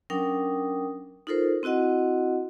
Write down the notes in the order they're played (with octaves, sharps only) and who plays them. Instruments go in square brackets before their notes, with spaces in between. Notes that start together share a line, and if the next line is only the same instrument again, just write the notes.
[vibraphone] F#3 C#4 D4 A#4 G5 D#6
D#4 F4 A4 A#4 C5
C4 E4 F#4 D#5 F#5